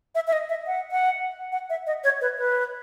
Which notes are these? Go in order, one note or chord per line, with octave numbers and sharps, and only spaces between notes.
E5
E5
D#5
E5
F#5
F#5
F#5
E5
D#5
C#5
B4
B4